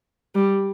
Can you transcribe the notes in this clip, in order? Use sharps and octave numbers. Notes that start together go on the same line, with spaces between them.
G3